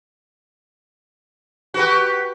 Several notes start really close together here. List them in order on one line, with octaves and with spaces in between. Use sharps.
F#4 B4 G4